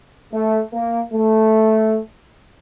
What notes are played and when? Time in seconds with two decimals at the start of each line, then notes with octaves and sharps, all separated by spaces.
0.32 A3
0.73 A#3
1.13 A3